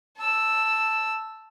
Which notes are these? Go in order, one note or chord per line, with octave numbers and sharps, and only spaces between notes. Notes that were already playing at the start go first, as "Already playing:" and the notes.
A5 E6